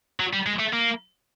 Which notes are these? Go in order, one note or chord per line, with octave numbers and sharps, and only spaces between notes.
F#3
G3
G#3
A3
A#3